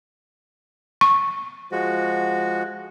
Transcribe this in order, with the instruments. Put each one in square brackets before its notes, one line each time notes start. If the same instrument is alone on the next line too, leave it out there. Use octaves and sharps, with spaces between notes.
[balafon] C#6
[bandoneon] F3 G#3 F#4